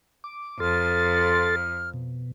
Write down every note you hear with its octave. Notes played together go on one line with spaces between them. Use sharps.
D6
F2 A4 C6 F6 A6
B2